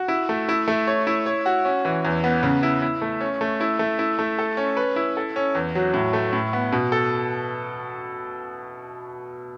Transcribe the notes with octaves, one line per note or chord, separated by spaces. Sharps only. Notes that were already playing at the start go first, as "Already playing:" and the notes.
Already playing: F#4
E4
A3
E4
A3
C#5
E4
C#5
F#4
C#4
E3
E2
B3
C#3
E4
E4
A3
C#4
A3
E4
A3
E4
A3
A4
C#4
B4
E4
A4
C#4
E2
F#3
A2
A3
A2
B3
B2
A4